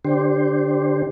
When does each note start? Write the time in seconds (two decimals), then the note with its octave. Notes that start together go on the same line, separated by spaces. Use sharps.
0.05 D3 D4 G4 C5